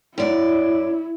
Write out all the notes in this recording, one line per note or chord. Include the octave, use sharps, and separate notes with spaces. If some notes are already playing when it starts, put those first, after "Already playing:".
F#2 E4 D5